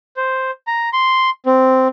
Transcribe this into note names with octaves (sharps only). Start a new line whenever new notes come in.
C5
A#5
C6
C4